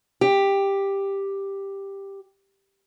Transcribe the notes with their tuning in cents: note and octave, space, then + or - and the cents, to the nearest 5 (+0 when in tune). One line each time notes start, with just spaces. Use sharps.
G4 +5